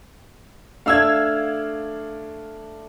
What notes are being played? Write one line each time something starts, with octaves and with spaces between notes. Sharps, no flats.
A3 D4 F5 E6 G#6